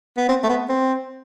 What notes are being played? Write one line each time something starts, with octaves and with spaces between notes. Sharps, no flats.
B3
C4
A3
B3
C4